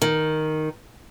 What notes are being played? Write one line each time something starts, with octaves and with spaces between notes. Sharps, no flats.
D#3